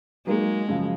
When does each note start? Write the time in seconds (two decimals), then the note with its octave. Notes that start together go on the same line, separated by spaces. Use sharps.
0.27 F#3 G#3 A#3 D#4
0.68 F#2 C#3 F3